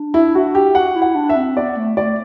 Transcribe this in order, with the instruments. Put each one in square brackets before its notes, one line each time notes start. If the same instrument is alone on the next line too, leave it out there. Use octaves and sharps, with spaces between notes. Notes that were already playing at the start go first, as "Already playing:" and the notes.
Already playing: [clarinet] D4
[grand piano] E4
F#4
G4
[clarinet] F#4 [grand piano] F#5
[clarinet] E4
[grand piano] F#5
[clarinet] D4
[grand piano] E5
[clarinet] C4
[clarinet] B3 [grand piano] D5
[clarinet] A3
[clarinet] A3 [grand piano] D5